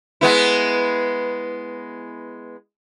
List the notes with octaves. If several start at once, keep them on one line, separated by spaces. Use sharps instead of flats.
G#3 B3 E4